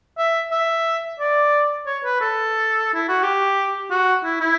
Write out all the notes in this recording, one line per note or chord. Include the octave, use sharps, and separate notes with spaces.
E5
E5
D5
C#5
B4
A4
E4
F#4
G4
F#4
E4
E4